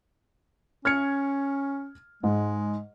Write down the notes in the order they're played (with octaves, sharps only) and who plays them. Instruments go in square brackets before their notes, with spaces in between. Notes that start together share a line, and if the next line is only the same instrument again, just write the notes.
[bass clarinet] C#4 [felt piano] F6 G#6 C#7
[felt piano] G#2 [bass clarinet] G#3